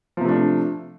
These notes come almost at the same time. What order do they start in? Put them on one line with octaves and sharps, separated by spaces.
F3 C3 A3 D4